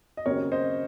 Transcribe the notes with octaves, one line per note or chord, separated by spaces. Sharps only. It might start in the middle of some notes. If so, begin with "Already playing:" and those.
D#5
D#2 C#3 F#3 C4 A#4 C#5
C5 D#5